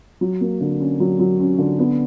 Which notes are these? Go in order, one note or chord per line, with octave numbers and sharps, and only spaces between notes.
F#3
A#3
D3
C#4
F#3
F#3
C#4
D3
B3